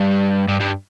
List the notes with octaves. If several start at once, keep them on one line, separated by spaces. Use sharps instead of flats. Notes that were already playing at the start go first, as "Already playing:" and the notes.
Already playing: G2
G2
G2